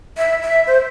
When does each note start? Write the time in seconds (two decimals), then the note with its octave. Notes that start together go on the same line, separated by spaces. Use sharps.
0.17 E5
0.43 E5
0.67 C5